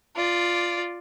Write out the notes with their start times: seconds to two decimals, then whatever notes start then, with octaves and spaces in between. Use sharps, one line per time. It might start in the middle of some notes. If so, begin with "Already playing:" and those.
0.16 F4 D5